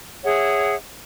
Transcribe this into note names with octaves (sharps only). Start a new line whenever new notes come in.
G#4 C#5 E5 F#5